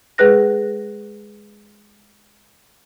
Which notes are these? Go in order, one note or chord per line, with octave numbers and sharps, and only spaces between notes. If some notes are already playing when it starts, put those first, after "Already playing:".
G#3 G#4 B4 F#6 A#6